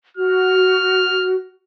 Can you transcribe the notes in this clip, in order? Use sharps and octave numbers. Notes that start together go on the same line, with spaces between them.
F#4 F6